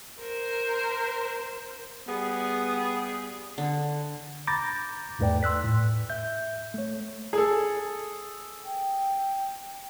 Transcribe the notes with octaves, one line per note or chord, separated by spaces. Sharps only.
A#4 C5
G3 B3 G#4
D3
A#5 B5 D6 G6 A6 A#6
E2 G#2 A3 B4 D5 G5
C6 E6 F#6 B6
A2
E5 G6
A3 C#5
G#4 A4
G5